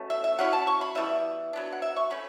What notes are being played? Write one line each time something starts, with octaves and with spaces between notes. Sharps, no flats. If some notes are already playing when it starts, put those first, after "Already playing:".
Already playing: B2 A3 C#4
E5
E5
F#3 C#4 E4 F#5
A5
C#6
B5
E3 G3 B3 E5
F#3 B3 D4
F#5
E5
C#6
A3 C#4 B5